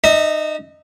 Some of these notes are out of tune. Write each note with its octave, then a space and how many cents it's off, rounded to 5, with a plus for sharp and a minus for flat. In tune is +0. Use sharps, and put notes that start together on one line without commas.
D#4 -25 E5 -45